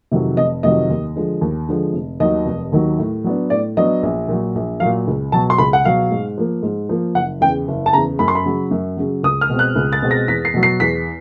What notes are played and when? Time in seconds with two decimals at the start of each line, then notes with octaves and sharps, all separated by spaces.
0.11 F2 C3 D#3 F#3
0.37 F1 D#5
0.63 F2 C3 D#3 F#3 D#5
0.90 D#2
1.16 D3 F3 G#3
1.41 D#2
1.69 D3 F3 G#3
1.94 F1
2.20 D#2 D#3 F#3 D#5
2.46 F1
2.72 D#2 D#3 F#3
2.99 A2
3.24 F#3 B3 D4
3.50 A2 D5
3.77 F#3 B3 D4 D#5
4.03 A#1
4.28 A#2 F#3
4.55 A#1
4.80 A#2 F#3 F5
5.07 C#2
5.32 B2 F#3 A5
5.50 C6
5.58 C#2 B5
5.73 F#5
5.85 B2 F#3 F5
6.11 G#2
6.38 F3 A#3
6.63 G#2
6.89 F3 A#3
7.15 F#1 F#5
7.41 E2 C#3 G5
7.68 F#1
7.86 A5
7.93 E2 C#3 A#5
8.19 F#2 B5
8.28 C6
8.35 B5
8.46 C#3 F#3
8.71 F#2
8.97 C#3 F#3
9.23 C#2 D#6
9.41 F6
9.50 B2 G#3 C4
9.59 F#6
9.76 C#2
9.93 A6
10.02 B2 G#3 C4
10.11 A#6
10.28 E2 B6
10.45 C7
10.54 B2 F#3
10.63 C7
10.80 E2 B6